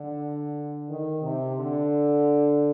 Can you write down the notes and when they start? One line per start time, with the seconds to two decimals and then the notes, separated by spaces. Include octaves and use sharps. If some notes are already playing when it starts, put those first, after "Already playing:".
Already playing: D3
0.88 D#3
1.22 C3
1.56 D3